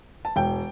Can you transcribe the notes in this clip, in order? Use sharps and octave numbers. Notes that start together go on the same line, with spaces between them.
A5
E1 G5